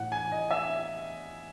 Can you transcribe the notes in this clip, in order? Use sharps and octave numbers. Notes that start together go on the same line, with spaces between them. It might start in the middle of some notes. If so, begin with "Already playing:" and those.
Already playing: A2 E3 F#5
G#5
D#5
E5